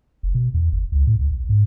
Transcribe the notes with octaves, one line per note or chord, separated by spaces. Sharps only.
F#1
B2
E2
G1
C#2
A2
C#2
B1
G#2